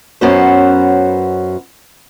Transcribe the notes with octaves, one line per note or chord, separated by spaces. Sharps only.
F#2 B3 C#4 F#4 C5